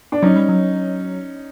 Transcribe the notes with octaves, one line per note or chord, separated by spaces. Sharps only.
D4
F#3 C#4 D#4
G3
F#3